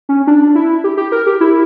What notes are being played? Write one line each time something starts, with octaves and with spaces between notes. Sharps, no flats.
C#4
D4
E4
G4
G4
A#4
G4
E4